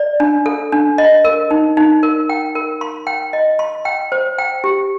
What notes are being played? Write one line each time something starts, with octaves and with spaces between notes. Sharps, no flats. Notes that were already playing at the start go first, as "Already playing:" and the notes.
Already playing: D5
D4
A4
D4
D#5
A#4
D#4
D#4
A#4
G5
A#4
C6
G5
D#5
C6
G5
C5
G5
G4